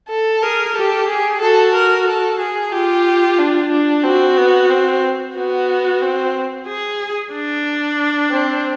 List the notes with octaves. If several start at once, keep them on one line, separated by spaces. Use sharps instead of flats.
A4
G#4 A#4
G4 A4
G#4
F#4 A4
A#4
A4
G#4
F4 G4
D4
D4
C4 F#4
B3
C4
B3 F#4
C4
G#4
D4
C4